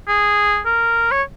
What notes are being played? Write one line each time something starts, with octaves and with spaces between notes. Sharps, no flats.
G#4
A#4
C#5